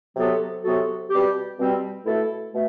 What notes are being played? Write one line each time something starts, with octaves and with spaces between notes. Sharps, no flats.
C3 F#3 B3 F#4 A4
C3 F#3 B3 F#4 A4
B2 G3 C4 G4
B2 G3 C4 G4
B2 A3 E4 A4
B2 A3